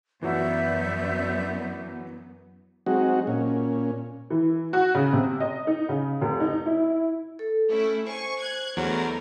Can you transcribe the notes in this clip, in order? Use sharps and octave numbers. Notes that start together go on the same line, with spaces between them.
F#2 E3 F#3 B3 F#4 D5 E5 G6
F#3 G#3 C4 D#4 F#4
A#2 C#4
E3
F#4
C#3
C3
D#5
D#4
C#3
F1
D#4
E4
A4
A3 C#4 E4
C5 G#5 C#6
F#6 G#6
E2 D3 F#3 A3 B3 A#4